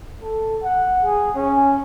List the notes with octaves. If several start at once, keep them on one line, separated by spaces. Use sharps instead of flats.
A4
F#5
G#4
C#4